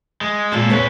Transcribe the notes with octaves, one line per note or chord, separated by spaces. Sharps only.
G#3
A#2 G#3 A#3 A4
E2 A#2 B4 C#5